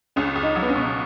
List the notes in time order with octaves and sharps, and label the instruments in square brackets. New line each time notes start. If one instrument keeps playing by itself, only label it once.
[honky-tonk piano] C#2 [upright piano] C#4
[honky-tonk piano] C#2
[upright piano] D#4
[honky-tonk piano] F#3
[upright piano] B3
C#4
[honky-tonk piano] B2